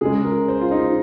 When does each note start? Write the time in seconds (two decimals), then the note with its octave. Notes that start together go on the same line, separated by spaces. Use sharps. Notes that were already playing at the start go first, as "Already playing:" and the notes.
0.01 C#3 G#3 G#4
0.24 A#4
0.48 C5
0.61 F4
0.71 D#4